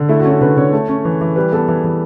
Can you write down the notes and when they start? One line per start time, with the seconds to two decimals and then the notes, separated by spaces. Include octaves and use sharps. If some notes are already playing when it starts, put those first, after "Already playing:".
Already playing: D3
0.09 A3 E4
0.20 F#4
0.25 C#4
0.31 F#4
0.41 D3 B4
0.57 D3 C#5
0.73 A3
0.88 C#4
1.05 E3
1.21 E3
1.36 G3 B4
1.52 B3 A4
1.68 E3
1.84 E3